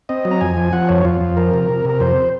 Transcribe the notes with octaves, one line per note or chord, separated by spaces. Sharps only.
C4 D#5
F#3
A#5
F2 G#5
F3
F3 F#5
F2 C#5
F2 F4
F2
F3 A#4
C3
C3
C3 A#4
F2 C5